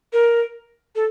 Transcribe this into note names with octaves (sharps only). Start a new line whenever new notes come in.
A#4
A4